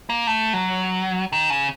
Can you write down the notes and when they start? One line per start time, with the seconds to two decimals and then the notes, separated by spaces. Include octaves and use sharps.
0.10 A#3
0.27 A3
0.53 F#3
1.33 D#3
1.50 C#3